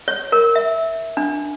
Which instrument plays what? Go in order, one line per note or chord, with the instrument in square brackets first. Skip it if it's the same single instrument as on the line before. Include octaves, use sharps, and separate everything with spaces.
[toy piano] C#5
A#4
E5
D4